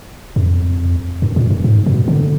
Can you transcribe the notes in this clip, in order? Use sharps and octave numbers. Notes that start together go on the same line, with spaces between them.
F2
F#2
A#2
F#2
G#2
B2
D3